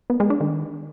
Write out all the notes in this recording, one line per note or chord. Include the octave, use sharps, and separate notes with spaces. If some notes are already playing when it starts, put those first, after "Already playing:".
B3
G#3
D4
D#3